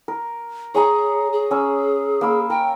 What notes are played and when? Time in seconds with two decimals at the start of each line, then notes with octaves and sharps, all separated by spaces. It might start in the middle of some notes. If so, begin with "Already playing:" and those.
0.08 A#4
0.75 G#4 C#5 G#5 A#5
1.33 G#4
1.51 C#4 E6
2.21 A#3 B5 E6
2.50 A#4 G5